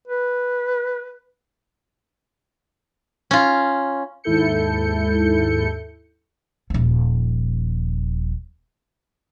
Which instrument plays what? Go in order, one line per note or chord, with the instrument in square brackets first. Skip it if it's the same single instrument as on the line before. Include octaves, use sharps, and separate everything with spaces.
[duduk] B4
[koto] C#4 F4
[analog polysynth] D#2 G#2 E4 A4 G6 C#7
[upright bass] D#1 F3